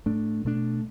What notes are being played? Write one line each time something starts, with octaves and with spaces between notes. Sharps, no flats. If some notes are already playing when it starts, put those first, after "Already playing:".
A2 A3 D4
B2 A3 D4